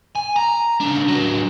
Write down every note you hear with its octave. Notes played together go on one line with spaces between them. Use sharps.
G#5
A#5
C#3 D4
F#3 D4